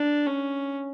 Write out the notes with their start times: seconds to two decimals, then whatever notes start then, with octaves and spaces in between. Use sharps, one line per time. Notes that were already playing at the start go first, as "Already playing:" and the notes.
Already playing: D4
0.26 C#4